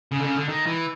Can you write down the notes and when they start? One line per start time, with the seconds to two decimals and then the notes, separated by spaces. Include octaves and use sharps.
0.12 C#3
0.19 D3
0.24 C#3
0.37 D3
0.49 D#3
0.67 E3